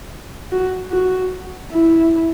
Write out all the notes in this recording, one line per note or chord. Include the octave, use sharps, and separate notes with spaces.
F#4
F#4
E4